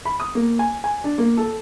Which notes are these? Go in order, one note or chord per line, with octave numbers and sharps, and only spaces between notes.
B5
D#6
A#3
G#5
G#5
D4
A#3
A4